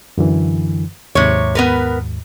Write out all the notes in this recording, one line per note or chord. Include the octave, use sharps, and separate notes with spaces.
F#2 D3 E3
D#2 G#2 C3 C#5
B3 A#4 B4